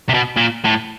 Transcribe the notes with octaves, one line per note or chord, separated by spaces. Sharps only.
C3
B2
A#2
A2